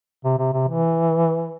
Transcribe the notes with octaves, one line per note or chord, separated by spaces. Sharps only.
C3
C3
C3
E3